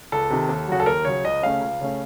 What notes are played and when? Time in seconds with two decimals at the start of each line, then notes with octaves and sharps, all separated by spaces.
0.12 C#2 A4
0.30 C3 D#3
0.49 D#2
0.68 C#3 F#3 F#4
0.80 A4
0.86 D#2 A#4
1.05 C#3 F#3 C#5
1.24 C#2 D#5
1.42 C#3 A3 C#4 F5
1.61 C#2
1.81 C#3 A3 C#4